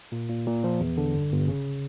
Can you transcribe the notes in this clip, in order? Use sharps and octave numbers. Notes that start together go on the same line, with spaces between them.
A#2
A#2
A#2
F3
E2
D3
G1
G1
C#3